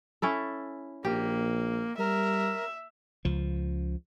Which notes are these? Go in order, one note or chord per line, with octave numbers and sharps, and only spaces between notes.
C#4 E4 A4
A#1 A#3 G4
G3 A#4 E5
C#2 F3